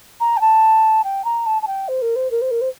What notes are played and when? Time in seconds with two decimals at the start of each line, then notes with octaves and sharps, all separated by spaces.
0.20 A#5
0.37 G5
0.41 A5
1.04 G5
1.25 A#5
1.46 A5
1.62 A5
1.67 G5
1.88 C5
2.02 A#4
2.16 C5
2.31 A#4
2.41 C5
2.51 A#4
2.61 C5